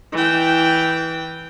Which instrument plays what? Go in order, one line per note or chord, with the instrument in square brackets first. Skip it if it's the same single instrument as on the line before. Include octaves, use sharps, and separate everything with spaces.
[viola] E3 G5